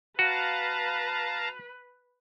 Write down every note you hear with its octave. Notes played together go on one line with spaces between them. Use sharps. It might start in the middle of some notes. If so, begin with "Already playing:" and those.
F#4 B4 F5 A5 A#5